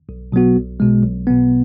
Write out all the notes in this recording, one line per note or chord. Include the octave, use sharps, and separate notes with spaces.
B1
B2 F#3 B3 F#4
B1
B2 G#3
B1
B2 B3